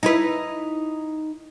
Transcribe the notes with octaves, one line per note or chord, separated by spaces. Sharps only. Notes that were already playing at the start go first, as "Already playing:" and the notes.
D#4 E4 B4